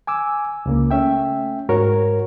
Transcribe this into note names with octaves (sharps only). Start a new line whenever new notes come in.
G#5 D6 E6
C#2 C#3 A#3
A3 C#4 E5 G5
G#2 F#4 A#4 C#5